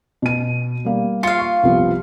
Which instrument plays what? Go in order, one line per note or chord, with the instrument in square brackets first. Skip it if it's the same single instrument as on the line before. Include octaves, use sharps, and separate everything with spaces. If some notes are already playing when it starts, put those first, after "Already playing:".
[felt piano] B2 D#7
G3 A#3
[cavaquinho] F4 F5 [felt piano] C#7
[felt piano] C#6
C2 F3 B3